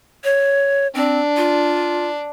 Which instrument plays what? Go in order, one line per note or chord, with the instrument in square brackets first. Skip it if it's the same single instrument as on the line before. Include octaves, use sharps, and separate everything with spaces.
[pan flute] C#5
[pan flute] C4 [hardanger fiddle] D4
[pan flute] F4